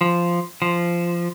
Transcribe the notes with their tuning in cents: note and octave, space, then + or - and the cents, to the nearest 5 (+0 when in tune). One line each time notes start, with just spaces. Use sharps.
F3 -10
F3 -15